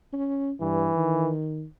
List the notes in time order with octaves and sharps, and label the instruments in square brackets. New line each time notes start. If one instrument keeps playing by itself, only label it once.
[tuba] C#4
[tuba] G2 [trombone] E3
[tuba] D#3